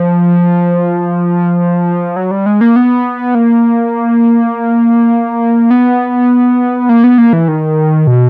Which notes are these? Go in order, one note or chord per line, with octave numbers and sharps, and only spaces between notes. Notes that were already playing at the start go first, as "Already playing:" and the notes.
Already playing: F3
F#3
G3
G#3
A#3
B3
A#3
B3
A#3
B3
A#3
E3
D#3
B2